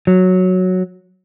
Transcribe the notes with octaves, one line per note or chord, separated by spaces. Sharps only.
F#3